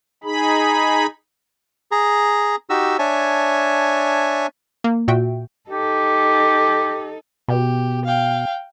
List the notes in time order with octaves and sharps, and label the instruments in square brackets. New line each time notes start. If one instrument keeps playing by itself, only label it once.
[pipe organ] D#4 G#4 B5
[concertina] G#4 A#5
D#4 F#4 G4 E6
D4 C#5 E5 G#5 A5
[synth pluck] A#3
A#2 F#4 E5 G5
[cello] D#4 A4 [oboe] G4
[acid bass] B2 [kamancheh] G4
[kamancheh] F5 G5